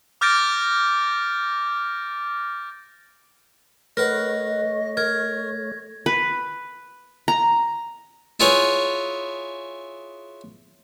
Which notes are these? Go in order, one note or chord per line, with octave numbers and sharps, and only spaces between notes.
D6 F6 G6 A6 A#6 D7
A3 A#4 B4 C#5 D#5 F#5 A#6
A#4 G#6
B4
A#5
E4 F4 G#4 B4 C#5